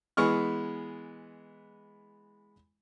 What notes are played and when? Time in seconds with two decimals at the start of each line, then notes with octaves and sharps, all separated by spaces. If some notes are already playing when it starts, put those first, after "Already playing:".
0.17 E3 G#3 B3 C#6 F6